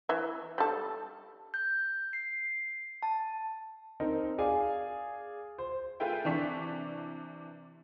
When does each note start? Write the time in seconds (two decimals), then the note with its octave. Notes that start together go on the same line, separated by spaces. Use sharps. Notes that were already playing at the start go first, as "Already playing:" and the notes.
0.09 E3 E5
0.58 G3 A4
1.54 G6
2.13 C7
3.03 A5
4.00 C4 D#4 A#4
4.38 G#4 D5 F5 G#5
5.58 C5
6.00 A3 F4 G#4 B4 E5 G5
6.24 C3 E3 D4 C#6 B6